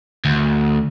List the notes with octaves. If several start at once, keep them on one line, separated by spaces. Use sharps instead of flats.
D2